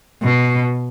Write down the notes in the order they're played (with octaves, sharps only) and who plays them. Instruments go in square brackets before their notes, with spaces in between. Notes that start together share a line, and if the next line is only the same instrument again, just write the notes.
[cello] B2